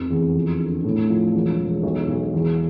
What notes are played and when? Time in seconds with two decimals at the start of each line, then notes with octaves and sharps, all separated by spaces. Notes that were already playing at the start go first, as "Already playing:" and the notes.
Already playing: F1
0.10 E2
0.35 F2
0.60 D3
0.84 A2
1.09 F3
1.33 E1
1.59 E1
1.83 B1
2.08 B1
2.33 E2